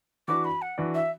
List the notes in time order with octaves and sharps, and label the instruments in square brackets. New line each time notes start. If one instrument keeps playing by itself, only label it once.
[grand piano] E3 D4 F#4 B4 D5 [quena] D6
[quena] B5
F#5
[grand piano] E3 D4 F#4 B4 D5
[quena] E5